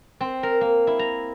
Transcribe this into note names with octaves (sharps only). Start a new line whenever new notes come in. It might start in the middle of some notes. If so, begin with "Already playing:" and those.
C4
A#4
A#3
E4
A#5